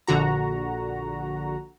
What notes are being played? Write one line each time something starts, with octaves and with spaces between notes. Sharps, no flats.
A#1 D3 F#4 A#5